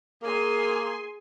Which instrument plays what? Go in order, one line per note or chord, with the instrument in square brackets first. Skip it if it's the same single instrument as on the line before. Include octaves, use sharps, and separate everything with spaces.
[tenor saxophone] A#3 [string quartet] G#4 G#5 C6